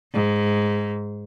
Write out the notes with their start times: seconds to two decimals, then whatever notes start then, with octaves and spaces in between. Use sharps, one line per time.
0.14 G#2